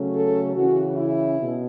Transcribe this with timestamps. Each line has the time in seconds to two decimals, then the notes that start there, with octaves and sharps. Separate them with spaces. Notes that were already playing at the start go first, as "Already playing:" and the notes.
Already playing: C#3 F#3 A3 C#4
0.15 A4
0.55 C#3 E3 C#4 F#4
0.96 E4
1.37 B2